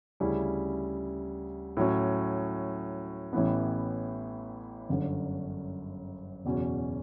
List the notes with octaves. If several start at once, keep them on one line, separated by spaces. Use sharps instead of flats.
D2 C#3 G3 C#4 E4
A2 F#3 C#4
A1 A2 E3 B3
G1 F#2 D3
F#1 E2 B2 F#3 C#4